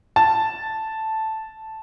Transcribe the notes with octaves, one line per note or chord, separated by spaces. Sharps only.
A5